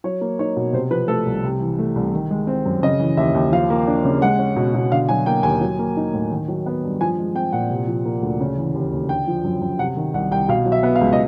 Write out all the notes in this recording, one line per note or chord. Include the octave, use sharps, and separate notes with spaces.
F#3 C#5
A#3
D#4 C#5
B2
C3 C5
F3 B4
A3 A4
C2
C3
E3
A3
C2
D#3
G#3
C4
F#2
C#3 D#5
E3
D#2 E5
D#2
F3 F5
A#3
D4
C#3
G#3 F#5
C#4
B2
B2
D3 F5
F#3 G#5
A#3 G5
D#2 G#5
F#3
A#3
D#4
A2
D#3
F#3
B3
G2
F3 G#5
G#3
C4 G5
A#2 F#5
C3
F3
A#3
D2
C#3
E3
D#2
D#2
D3 G5
F3
F#2
F#2
C3 F#5
D#3
C2 F#5
C2 G5
B2 F5
F#3
E5
B3
F5
C#2
D#5